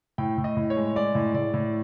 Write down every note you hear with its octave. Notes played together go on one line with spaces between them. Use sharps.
A2 G5
A2
D#5
A2
C#5
G#3
G#3 D5
A2
A2 D5
A2